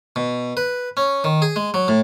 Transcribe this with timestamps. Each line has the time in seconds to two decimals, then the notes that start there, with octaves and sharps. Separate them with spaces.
0.16 B2
0.57 B4
0.97 C#4
1.24 D#3
1.42 G#4
1.56 G#3
1.74 F#3
1.88 A2